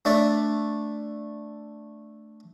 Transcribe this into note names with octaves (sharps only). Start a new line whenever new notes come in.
A3 D4 D5 E5